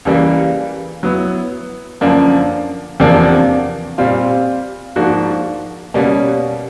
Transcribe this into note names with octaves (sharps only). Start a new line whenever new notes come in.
C#2 C#3 E3 G3 A#3
F#3 B3 E4
F#2 D3 F3 A#3 D4
E2 C3 F3 A#3 D4
A#2 G3 C4 F4
G#2 F3 A#3 D4 F#4
B2 G3 A#3 C#4